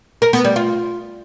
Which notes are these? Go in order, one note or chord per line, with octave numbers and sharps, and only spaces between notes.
A#4
B3
G3
F4